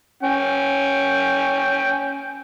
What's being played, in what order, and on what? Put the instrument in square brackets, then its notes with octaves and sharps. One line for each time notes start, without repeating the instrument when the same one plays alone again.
[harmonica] C#4 G5